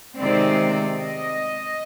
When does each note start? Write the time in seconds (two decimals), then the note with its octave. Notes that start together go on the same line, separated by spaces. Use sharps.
0.17 C3 D#3 G#3 C4 D5
0.98 D#5